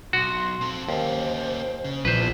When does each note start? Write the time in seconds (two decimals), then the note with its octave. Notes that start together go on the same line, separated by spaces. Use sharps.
0.13 B1 F#4 C6
0.61 C4 A4
0.89 D#2 A#3 C#4 C5
1.84 C#3
2.05 A#1 E3 B3 B4 C5